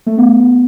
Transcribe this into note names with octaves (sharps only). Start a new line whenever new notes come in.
A3
B3